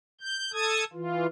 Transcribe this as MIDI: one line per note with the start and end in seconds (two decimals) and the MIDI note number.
0.21 0.52 91
0.53 0.84 69
0.53 0.84 81
0.53 0.84 87
0.53 0.84 92
0.93 1.27 52
0.93 1.27 65